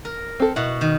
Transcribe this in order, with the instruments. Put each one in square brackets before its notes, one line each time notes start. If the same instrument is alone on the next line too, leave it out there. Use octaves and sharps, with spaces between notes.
[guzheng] A#4
[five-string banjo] C4 A4
[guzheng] B2 F#5 [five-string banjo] E4
[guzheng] D#3